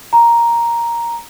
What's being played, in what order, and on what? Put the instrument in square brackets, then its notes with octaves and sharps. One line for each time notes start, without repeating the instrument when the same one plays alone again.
[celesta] A#5